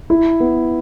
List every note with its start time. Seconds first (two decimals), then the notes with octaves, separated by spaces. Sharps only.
0.10 E4
0.40 B3